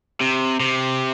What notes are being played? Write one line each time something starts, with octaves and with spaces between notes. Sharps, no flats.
C3
C3